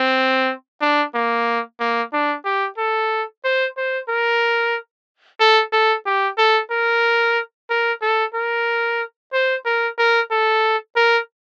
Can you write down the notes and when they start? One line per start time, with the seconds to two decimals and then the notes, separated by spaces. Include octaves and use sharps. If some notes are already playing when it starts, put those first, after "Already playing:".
Already playing: C4
0.82 D4
1.15 A#3
1.80 A#3
2.13 D4
2.45 G4
2.78 A4
3.45 C5
3.77 C5
4.09 A#4
5.40 A4
5.73 A4
6.06 G4
6.38 A4
6.71 A#4
7.70 A#4
8.02 A4
8.34 A#4
9.33 C5
9.66 A#4
9.98 A#4
10.31 A4
10.96 A#4